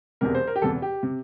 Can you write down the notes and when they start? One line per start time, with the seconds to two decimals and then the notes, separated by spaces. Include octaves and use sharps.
0.21 E1 E2 C3 A#4
0.35 C5
0.47 A#4
0.56 G4
0.62 E1 E2 C3 A4
0.82 G4
1.03 C3